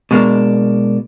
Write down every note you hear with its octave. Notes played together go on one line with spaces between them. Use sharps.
B2 G#3 A#3 D4